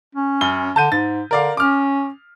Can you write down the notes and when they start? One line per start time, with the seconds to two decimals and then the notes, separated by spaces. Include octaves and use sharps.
0.15 C#4
0.41 F#2 G7
0.76 D3 A5 G6 D#7
0.92 G#2 A6
1.31 D3 A#4 D5 F5
1.57 C#4 D6 F6